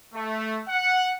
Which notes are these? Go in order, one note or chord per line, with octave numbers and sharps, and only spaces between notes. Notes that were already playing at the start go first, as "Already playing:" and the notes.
A3
F#5